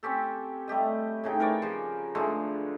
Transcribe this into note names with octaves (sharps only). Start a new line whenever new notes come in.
C4 C#4 G4 A4
G3 A3 G4 D#5
A2 C#3 D#4 G5
A#4 B4 C#5 D5
C#3 F3
D3 F3 G#3 A3